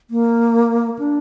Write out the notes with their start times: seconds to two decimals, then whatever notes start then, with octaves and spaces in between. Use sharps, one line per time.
0.10 A#3
0.99 D4